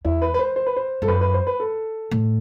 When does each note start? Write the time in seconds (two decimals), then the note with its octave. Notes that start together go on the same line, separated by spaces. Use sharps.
0.05 E2 E4
0.22 B4
0.34 B4
0.39 C5
0.56 C5
0.66 B4
0.76 C5
1.02 G2 A4
1.08 F#2 B4
1.21 B4
1.34 C5
1.47 B4
1.60 A4
2.11 A2